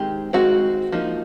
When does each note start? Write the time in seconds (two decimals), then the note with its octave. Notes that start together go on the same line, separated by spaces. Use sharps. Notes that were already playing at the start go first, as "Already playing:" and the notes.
Already playing: D#3 G#3 C4 G4
0.33 D#3 G#3 C4 F#4
0.92 F3 A#3 D#4